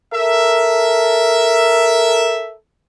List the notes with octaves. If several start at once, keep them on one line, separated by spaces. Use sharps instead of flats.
A4 A#4 E5